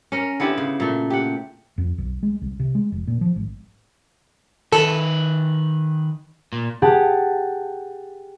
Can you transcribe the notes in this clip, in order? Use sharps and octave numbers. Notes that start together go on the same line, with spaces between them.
C#4 A#4
D3 B3 E4 G4
C#3
A#2 A3
G4 F#5
F2
B1
G#3
C2
C3
G#3
F1
A#2
F3
G#1
D#3 A4 B4
A#2
G4 G#4 F#5 A5